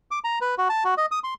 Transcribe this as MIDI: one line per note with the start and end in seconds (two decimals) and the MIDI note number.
0.11 0.19 86
0.24 0.39 82
0.41 0.55 71
0.58 0.68 66
0.70 0.84 81
0.85 0.94 66
0.98 1.06 75
1.11 1.19 87
1.24 1.34 84